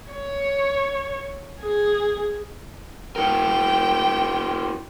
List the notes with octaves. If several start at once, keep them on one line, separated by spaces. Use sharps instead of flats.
C#5
G#4
E4 F#4 A#4 G5